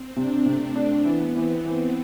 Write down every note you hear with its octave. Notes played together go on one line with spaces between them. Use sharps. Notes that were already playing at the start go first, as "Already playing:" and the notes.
Already playing: C4
C3 D4
C3 A3
D4
E3 B3
E3 C4
E3